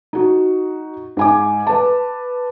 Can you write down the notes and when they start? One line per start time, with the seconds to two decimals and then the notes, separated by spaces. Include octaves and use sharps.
0.13 D#4 F#4
1.17 G#2 G#5 D6
1.67 B4 A5